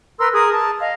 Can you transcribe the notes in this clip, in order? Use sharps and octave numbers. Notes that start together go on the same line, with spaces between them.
A#4 B4 C6 E6
G#4 A#4 D#6
A5
D#5 F5